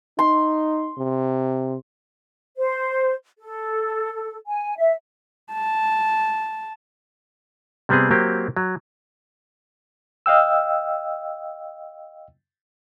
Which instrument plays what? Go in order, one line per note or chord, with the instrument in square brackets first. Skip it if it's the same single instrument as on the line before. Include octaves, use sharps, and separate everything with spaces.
[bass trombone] D#4 [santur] C6
[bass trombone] C3
[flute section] C5
A4
G#5
E5
[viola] A5
[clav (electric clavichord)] C3 G3 B3 C4 G#4
F#3 A#3 C4 G4
F#3
[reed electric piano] D#5 F5 G5 E6